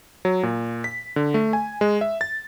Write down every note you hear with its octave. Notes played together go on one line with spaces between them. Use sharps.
F#3
A#2
B6
D3
A3
G#5
G#3
E5
A6